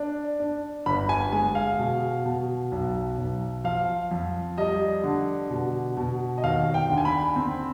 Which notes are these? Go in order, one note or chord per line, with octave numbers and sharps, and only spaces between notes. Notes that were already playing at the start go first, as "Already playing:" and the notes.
Already playing: D4
D4
G1 B5
G#5
G#3 G#5
F5
B2
B2
B1
B1
F3 F5
F2
G3 D#5
D3
B2
B2
D#5
D#2 F5
G5
D3
G#5
B5
C4